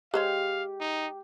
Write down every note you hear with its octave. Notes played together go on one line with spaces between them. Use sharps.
G#3 G4 C5 C#5 F5
D#4